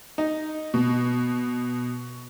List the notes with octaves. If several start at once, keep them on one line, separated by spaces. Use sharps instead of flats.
D#4
B2